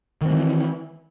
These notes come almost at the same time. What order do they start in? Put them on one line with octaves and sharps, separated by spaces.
D#3 C4 G#3 E3